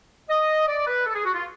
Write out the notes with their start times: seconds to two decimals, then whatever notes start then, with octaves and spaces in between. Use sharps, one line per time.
0.29 D#5
0.67 D5
0.87 B4
1.06 A4
1.15 G#4
1.25 F#4
1.34 F4